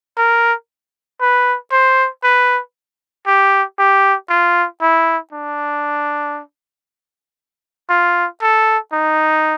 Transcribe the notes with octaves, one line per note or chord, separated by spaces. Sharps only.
A#4
B4
C5
B4
G4
G4
F4
E4
D4
F4
A4
D#4